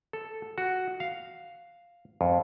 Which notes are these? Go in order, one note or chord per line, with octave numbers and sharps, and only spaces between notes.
A4
F#4
F5
F2